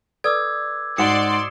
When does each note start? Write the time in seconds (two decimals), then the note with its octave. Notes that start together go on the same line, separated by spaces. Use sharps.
0.24 A4 B4 D5 D6 E6 G#6
0.98 G#2 F#4 D5 F#5 C6 D#6 C#7 E7